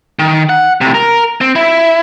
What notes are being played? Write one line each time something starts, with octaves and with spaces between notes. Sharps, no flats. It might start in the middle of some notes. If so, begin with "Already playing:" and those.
D#3
F#5
A2 C3
A#4
C4
E4